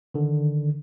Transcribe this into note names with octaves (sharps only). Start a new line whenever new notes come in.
D3 D#3